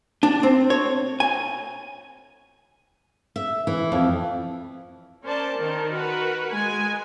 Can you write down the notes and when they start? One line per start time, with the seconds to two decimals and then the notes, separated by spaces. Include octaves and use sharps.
0.23 D4
0.43 C4
0.70 C#5
1.20 G#5
3.36 E5
3.67 E3
3.92 F2
5.24 C#4 A#4 C5 D5 A5
5.58 D#3 A#4
5.93 F#4 A#4 B4
6.51 G#3 G#5